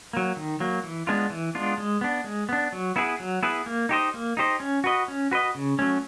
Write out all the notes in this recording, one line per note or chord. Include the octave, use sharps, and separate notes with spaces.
F#3 A#3
D#3
F#3 A#3
E3
G#3 B3 D4 F4
E3
G#3 B3 D4 F4
G#3
B3 D4
G#3
B3 D4
F#3
B3 E4 G#4 B4
F#3
B3 E4 G#4 B4
A#3
D#4 G4 C5 D#5
A#3
D#4 G4 C5 D#5
C#4
F#4 B4 D#5
C#4
F#4 B4 D#5
C#3
F#3 A3 C#4